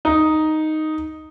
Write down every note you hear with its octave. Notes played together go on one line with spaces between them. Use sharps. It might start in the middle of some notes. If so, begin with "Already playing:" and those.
D#4